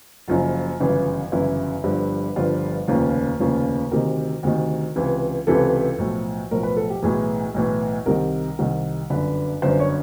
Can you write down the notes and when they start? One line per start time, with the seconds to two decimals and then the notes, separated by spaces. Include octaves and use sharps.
0.28 F#1 F#2 C#3 F3 F4
0.80 G1 F#2 C#3 E3
1.32 G1 F#2 C#3 E3 E4
1.84 G1 G2 D3 F3
2.36 G1 G2 D3 F3 F4
2.88 F1 D#2 C#3 F3 F4
3.39 F1 D#2 C#3 F3
3.91 D2 C3 D#3 A#4
4.43 D2 C3 D#3
4.96 C#2 C3 E3
5.47 C#2 C3 E3 A4
5.98 B1 A2 F3
6.51 B1 A2 F3 A#4
6.63 B4
6.77 A4
6.90 G4
7.02 B1 A2 E3 G#4
7.54 B1 A2 E3
8.06 C2 C3 D#3 A#4
8.59 C2 C3 D#3
9.10 G1 F#2 D3 B4
9.62 G1 F#2 D3 C5
9.80 C#5